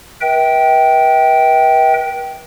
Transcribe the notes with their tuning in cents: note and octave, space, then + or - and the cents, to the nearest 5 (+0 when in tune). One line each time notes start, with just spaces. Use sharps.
B4 -40 E5 -40 G5 -10